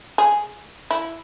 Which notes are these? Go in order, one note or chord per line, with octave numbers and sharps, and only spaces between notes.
G#4
E4